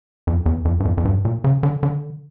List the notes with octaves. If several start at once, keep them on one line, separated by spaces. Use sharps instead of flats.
F2
E2
F2
G2
F2
F2
G2
A#2
C#3
D3
D3